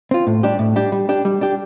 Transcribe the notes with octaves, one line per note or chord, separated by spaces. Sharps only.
C4 F4
A2
G3 D4 G4
A2
G3 D4 G4
G3
D4 G4
G3
D4 G4